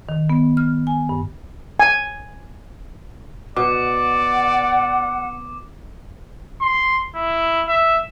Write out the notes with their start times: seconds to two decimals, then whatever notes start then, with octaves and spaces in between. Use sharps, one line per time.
0.09 D#3
0.30 B3
0.57 F6
0.87 G#5
1.09 G2
1.80 G#5
3.56 B2 D5 F#5 D6
6.61 C6
7.15 E4
7.67 E5